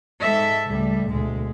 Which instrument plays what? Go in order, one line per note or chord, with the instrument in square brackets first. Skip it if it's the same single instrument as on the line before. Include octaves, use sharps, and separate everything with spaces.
[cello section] G#2 A4 E5
[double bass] C#2 A3 [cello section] G3
[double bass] D2 B2 [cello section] G#3